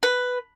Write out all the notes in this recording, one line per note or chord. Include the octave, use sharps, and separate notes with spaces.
B4